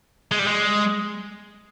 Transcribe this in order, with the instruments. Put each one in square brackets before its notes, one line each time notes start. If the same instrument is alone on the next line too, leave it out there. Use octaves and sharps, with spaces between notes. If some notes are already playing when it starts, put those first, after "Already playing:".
[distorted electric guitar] G#3
G3
G#3